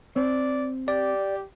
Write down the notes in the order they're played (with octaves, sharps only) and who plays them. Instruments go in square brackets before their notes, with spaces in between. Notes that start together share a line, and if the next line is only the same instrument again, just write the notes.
[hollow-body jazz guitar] C4 [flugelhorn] D5
[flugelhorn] G4 [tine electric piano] D5